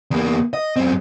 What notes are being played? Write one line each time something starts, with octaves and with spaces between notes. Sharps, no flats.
E2 A#3
D#5
F#2 C4